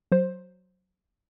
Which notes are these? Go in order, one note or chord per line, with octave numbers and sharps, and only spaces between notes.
F#3 C5